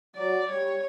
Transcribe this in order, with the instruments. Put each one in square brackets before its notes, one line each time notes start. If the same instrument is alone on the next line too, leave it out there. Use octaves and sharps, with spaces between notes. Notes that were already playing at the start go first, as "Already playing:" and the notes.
[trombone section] F#3 [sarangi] D5
[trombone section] G3 [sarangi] C#5